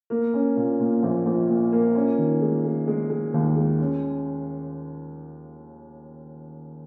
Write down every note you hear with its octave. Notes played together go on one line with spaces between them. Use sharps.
A#3
C#4
A#2
A#2
A#1
A#1
A#2
A#3
C#4
D#3
G#3
G#3
G#3
G#3
D#2
G#3
C#4